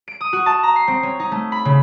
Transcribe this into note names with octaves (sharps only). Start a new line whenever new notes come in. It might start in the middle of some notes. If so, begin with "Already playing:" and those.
D7
D#6
F#4
A5
A#5
C7
C4
C#4
D#4
A3
B5
C#3